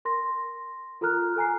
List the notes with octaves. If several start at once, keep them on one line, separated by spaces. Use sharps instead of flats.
A#4 C6 A#6
F4 A4 A#4 A#5 F6 F#6
A4 G#5 A#5 C7